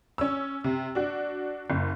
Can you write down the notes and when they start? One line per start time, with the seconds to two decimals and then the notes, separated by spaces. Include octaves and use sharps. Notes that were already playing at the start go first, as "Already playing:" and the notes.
0.18 C#4 E6
0.64 C3
0.95 D4 F#4
1.70 F#1